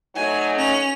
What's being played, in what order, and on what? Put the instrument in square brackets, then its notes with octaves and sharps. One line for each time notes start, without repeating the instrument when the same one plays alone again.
[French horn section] F#3 A3 D#4 [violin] G#5
[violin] C#4 F7